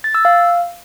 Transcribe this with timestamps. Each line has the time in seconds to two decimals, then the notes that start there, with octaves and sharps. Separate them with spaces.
0.04 A6
0.15 E6
0.25 F5